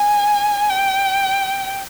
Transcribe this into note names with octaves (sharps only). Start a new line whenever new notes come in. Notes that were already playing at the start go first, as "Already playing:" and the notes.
Already playing: G#5
G5